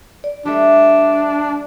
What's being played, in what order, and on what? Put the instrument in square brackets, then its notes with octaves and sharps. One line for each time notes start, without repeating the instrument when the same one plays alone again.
[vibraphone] D5
[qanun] G3 A3 [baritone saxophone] D4